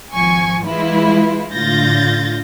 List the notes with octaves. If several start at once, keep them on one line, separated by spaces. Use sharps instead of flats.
G#1 F3 G#5 C#6 G#6
E3 G#3 E4 F4 B4
A2 D3 F4 G6 A6 A#6